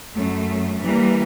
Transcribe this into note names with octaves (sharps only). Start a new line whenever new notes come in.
F#2 A3
E3 G3 A#3